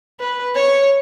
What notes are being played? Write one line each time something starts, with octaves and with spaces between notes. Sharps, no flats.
B4
C#5